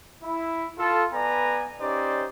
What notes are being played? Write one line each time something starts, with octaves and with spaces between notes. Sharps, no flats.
E4
F4 A4
B3 B4 D5 G#5 A#5
C#4 D#4 G4 C5 D5